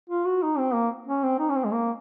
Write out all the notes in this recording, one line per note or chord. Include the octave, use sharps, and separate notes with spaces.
F4
F#4
D#4
C4
A#3
C#4
C4
D#4
C#4
C4
G#3
A#3